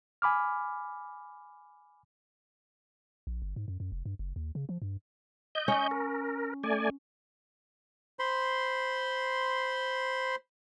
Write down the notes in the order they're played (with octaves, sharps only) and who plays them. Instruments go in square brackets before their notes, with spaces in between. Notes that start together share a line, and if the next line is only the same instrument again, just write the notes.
[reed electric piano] G#5 B5 D6 F6
[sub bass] A#1
G1
G#2
F#2
F#2
F1
G2
F#1
D#2
C#3
F3
G2
[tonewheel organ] D#5 G6
[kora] C#4
[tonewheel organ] A#4
A3 D5 G#5
[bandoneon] C5 B5 C6